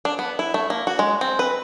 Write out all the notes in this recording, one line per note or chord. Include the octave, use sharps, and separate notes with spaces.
D4
B3
E4
A3
A#3
F#4
G#3
C4
B4